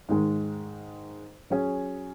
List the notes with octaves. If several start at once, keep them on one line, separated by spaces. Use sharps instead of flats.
G#2 D#3 G#3
F#3 C#4 G#4